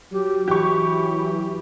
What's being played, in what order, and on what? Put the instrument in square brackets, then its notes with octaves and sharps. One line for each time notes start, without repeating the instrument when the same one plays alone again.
[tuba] F#3 [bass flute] G4
[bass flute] E3 [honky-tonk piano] G4 C#6